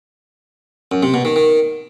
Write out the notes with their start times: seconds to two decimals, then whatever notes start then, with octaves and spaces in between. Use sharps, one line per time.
0.92 F#2
1.03 C3
1.14 B2
1.25 D#3
1.36 D#3